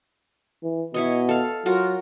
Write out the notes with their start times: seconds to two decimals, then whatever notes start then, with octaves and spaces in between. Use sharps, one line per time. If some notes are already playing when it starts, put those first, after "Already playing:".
0.63 E3
0.94 B2 E4 C#5 D#5
1.29 A4 F5
1.66 F#3 F4 F#4 A#4